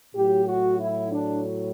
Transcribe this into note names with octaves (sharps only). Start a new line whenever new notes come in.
A2 F#3 G4
F#4
E4
D4